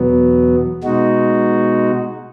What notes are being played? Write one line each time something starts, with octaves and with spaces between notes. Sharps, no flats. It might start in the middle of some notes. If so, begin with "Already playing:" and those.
Already playing: E2 B2 F#3 B3
B2 G#3 D#4 F#4